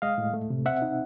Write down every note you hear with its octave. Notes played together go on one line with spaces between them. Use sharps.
G#3 D#5 F5
A2
A3
C3
C4 E5 F#5
D#4